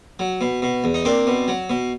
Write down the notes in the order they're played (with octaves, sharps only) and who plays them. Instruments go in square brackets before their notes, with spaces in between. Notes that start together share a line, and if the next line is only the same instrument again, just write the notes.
[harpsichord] F#3
B2
B2
E2
D#4
A#3 C4 D4
B2
F#3
B2